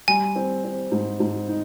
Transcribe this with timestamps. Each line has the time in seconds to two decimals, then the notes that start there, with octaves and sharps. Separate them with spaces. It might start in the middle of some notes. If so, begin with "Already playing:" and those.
0.08 G3 G#5
0.36 C4
0.64 C4
0.92 G#2
1.20 G#2
1.48 D#4